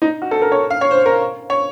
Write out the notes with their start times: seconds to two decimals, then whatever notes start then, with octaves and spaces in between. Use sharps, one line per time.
0.02 D#4
0.22 F#4
0.31 A4
0.42 A#4
0.52 C#5
0.70 F5
0.81 C#5
0.91 C5
1.06 A#4
1.50 C#5